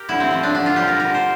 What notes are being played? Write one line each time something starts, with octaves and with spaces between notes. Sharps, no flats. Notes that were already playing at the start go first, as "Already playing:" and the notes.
Already playing: G4 A#4
D3 E4
C4
F3 A3 C4
D4
D3 D4
F4
G3 G4
A#4
D3 A#4
C5